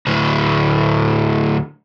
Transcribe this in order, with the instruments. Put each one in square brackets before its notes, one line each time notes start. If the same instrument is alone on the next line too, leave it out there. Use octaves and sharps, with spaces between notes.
[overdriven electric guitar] D2 A2